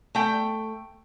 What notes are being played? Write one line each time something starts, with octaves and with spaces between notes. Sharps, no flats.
A3 G5